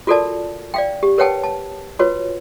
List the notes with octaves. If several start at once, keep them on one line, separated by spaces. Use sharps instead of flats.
F4 F#4 A4 A#4 D5 A5
D5 F5 G5
G4
A#4 B4 C#5 F#5 G5 A5
A5
F4 F#4 B4 C#5